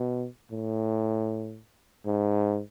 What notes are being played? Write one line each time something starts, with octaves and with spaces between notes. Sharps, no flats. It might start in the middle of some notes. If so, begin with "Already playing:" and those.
Already playing: B2
A2
G#2